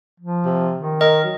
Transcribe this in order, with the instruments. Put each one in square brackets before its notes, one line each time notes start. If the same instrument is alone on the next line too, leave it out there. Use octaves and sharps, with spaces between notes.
[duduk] F3
[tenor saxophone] C3
[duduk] D#3
[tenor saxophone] A#4 [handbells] D#5
[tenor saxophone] F#3